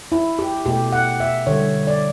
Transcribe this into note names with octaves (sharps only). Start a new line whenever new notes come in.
E4
G4
B2 A3 G4
F#5
E5
D3 G3 C#5
D5